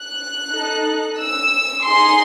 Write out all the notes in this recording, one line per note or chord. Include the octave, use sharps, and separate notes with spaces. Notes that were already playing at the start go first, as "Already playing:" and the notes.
Already playing: F#6
D#4 A4
E6
D#4 G#4 C6